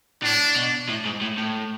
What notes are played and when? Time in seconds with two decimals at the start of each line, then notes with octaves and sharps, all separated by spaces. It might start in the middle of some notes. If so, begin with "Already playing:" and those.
0.23 A2 D4
0.56 B2
0.89 A2
1.05 G#2
1.21 A2
1.37 A2